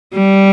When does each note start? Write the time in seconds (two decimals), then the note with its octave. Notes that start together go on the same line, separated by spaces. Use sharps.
0.14 G3